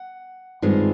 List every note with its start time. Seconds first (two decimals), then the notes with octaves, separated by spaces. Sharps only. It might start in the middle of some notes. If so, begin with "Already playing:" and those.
Already playing: F#5
0.62 G2 D#3 G#3 C4 F4